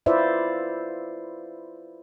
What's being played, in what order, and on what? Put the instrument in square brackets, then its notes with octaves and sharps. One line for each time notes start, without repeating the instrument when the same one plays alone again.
[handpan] E4 F4 B4 C5 D5 E5